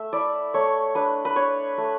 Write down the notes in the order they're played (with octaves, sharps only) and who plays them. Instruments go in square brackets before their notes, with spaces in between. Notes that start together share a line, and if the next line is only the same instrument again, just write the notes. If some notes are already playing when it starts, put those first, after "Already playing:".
Already playing: [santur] A3 E5
E4 D5
A3 C#5
D4 B4
B4
D4 C#5
A3